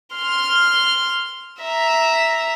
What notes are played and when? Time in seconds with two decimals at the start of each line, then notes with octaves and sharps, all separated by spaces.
0.16 C6 F6
1.61 E5 A#5